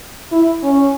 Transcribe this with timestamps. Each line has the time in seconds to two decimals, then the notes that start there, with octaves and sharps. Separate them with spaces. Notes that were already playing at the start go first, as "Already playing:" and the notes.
0.32 E4
0.63 C#4